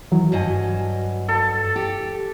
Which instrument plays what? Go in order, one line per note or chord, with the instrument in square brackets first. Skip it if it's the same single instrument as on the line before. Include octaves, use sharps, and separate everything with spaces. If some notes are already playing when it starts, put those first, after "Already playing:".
[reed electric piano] D#3 E3 F#3
[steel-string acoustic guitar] G2 F#3 D#5 [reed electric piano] F#4 G#5
[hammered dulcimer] A4
[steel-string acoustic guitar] G4